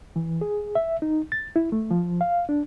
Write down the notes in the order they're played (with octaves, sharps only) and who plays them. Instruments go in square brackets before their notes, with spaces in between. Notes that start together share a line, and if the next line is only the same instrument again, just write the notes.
[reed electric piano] E3
G#4
E5
D#4
A6
E4
A3
F3
F5
D4